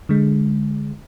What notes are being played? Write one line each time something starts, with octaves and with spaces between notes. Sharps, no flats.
D3 G#3